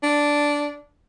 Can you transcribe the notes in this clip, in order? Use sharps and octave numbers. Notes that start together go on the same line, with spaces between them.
D4